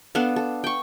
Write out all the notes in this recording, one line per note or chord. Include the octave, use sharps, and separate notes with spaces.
B3 D4 A4 F5
A4
G5 C#6